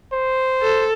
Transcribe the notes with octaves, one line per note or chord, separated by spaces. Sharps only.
C5
A4